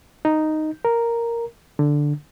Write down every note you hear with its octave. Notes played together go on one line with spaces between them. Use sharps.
D#4
A#4
D3